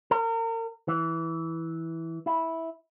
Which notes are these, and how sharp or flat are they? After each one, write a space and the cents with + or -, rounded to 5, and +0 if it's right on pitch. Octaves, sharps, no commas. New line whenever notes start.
A#4 -35
E3 -10
E4 -10